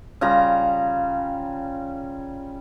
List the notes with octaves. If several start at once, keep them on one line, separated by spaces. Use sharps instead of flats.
C#3 G3 F4 A#5